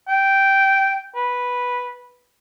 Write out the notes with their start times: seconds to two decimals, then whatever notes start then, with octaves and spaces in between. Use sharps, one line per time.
0.08 G5
1.16 B4